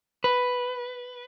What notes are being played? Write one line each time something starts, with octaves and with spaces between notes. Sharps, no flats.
B4